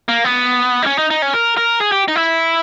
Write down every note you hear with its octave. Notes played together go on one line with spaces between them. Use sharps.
A#3
B3
D#4
C#4
D#4
D#4
C#4
A#4
A#4
G#4
G4
D#4
E4